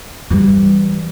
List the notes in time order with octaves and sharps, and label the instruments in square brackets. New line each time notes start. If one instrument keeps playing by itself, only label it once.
[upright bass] E3 G3